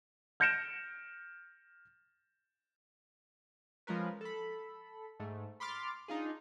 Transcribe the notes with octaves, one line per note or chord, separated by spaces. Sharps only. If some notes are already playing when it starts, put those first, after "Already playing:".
F6 G6 A#6 C#7 D7 E7
F3 G#3 C#4 A#4 B4
A4 B5
G#2 A3
B5 C6 D6 F6 A6
D4 D#4 F4 G#4